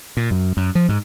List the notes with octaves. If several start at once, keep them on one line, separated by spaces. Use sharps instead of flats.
A#2
F#2
F#2
F3
G#2